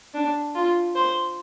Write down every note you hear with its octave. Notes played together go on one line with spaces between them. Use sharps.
D4
F4
C5